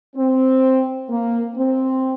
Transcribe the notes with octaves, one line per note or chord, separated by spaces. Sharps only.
C4
A#3
C4